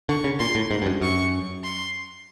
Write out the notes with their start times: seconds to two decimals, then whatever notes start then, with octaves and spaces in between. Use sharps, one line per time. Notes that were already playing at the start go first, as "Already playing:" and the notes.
0.09 D3 C#6
0.24 C#3
0.39 A#2 C6
0.55 A2
0.71 G#2
0.82 G2
0.86 F#2
1.01 F#2 C#6
1.64 C6